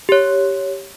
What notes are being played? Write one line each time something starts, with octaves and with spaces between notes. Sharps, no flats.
G4 C#5